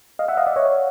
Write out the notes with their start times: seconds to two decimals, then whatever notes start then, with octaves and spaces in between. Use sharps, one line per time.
0.19 D#5 F5
0.28 E5 F#5
0.37 D#5 F5
0.47 D5 E5
0.56 C#5 D#5